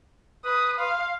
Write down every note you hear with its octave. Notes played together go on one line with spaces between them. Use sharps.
B4 D#6
F5 C6